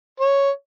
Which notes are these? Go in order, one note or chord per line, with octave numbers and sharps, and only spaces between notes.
C#5